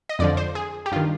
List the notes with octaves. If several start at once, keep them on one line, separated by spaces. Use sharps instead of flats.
D#5
F2 D3 F3 D5
C5
G#4
G4
G2 D#3 F4